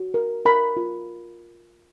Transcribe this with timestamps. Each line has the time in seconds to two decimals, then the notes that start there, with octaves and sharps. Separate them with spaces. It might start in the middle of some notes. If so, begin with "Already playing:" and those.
Already playing: F#4
0.14 A#4
0.45 A#4 B5
0.77 F4